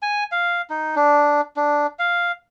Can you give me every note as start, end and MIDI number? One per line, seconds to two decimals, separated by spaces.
0.02 0.24 80
0.32 0.61 77
0.70 0.95 63
0.96 1.41 62
1.57 1.87 62
1.99 2.32 77